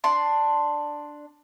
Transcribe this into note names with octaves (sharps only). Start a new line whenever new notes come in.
D4 C6